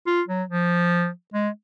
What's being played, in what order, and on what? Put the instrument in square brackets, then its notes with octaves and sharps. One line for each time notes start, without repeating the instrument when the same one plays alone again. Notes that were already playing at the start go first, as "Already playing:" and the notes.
[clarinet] F4
F#3
F3
G#3